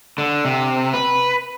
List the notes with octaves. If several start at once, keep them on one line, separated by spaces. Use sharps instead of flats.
D3
C3
B4